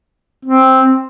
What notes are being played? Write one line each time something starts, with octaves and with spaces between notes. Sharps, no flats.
C4